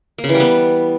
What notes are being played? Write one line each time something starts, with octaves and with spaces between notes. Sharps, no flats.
A#3
C#3
E3
G3
B3